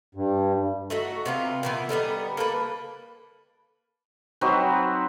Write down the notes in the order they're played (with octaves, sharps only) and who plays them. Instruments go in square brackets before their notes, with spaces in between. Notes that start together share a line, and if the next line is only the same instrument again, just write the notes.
[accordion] G2
[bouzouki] A3 D#4 F#4
C3 B3 F4
A#2 E3 B3
D3 G3 B3 D#4
A#3 A4 B4
[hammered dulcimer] F#3 C4 D#4 B4